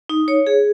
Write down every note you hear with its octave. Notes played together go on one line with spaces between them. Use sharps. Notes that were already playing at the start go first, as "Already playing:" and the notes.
D#4
C#5
G#4